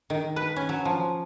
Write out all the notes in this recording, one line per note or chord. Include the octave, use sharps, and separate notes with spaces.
D#3
B4
C#4
F#3
F3